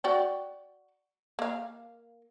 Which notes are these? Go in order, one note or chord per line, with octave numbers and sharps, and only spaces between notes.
F#4 D5 G5
A#3 F5